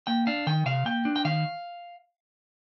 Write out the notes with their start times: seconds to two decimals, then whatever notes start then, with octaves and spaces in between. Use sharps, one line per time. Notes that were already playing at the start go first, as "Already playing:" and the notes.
0.07 A#3 G5
0.27 D4 F5
0.47 D#3 G5
0.66 C3 F5
0.85 A#3 G5
1.05 D4
1.16 G5
1.25 D#3 F5